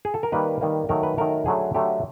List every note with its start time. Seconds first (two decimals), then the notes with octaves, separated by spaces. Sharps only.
0.05 G#4
0.14 A4
0.23 A#4
0.32 D#3 G3 A#3 B4
0.61 D#3 G3 A#3
0.89 D#3 F#3 A3 A#4
1.03 B4
1.18 D#3 F#3 A3 A#4
1.46 D3 F#3 A3 G#4
1.74 D3 F#3 A3 G4